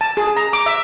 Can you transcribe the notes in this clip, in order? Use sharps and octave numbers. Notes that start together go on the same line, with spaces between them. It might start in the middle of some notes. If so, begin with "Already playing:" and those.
A5
G#4
A#5
D6
E5